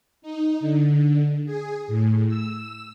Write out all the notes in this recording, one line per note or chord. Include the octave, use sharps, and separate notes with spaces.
D#4
D3
G#4
A2
E6